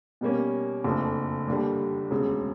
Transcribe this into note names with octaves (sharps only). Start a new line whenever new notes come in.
B2 G3 A#3 C#4
F#1 F2 D3 F3 A3
D#2 D3 G3
E1 D2 C#3